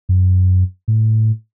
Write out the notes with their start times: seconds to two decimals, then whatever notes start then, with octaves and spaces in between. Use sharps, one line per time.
0.09 F#2
0.88 A2